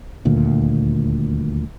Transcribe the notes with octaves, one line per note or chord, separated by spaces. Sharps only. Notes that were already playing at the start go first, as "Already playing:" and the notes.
D#1 D2 A#2